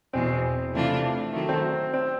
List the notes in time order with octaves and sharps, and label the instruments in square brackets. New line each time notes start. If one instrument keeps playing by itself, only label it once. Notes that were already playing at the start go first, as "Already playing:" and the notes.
[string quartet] E2 B2 G#3 [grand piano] C4
[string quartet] C3 E3 A3 D4 F4
D#3 F#3 A3
[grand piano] C4
C4